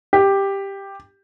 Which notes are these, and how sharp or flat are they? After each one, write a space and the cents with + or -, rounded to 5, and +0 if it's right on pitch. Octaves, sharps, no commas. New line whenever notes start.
G4 +5